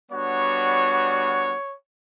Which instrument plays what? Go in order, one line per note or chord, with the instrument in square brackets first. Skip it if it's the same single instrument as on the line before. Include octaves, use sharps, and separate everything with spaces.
[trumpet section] G3 B3 D4 F#4 C#5